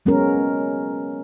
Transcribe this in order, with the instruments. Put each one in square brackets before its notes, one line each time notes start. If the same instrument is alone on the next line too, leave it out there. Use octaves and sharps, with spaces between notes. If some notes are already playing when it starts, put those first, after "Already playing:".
[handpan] F#3 G#3 B3 C#4 F#4 A#4